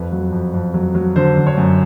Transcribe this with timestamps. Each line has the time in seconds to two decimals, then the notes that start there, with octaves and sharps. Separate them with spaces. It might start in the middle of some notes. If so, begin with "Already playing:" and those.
Already playing: F2 B4
0.12 F#3
0.32 F2
0.53 F2
0.74 F#3
0.95 F#3
1.16 D3 C5
1.37 D3
1.47 C#5
1.58 F#2